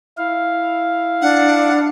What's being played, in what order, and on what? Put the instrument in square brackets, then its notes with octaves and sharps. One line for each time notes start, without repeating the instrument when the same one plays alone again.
[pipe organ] E4 F5
[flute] D4 [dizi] F#5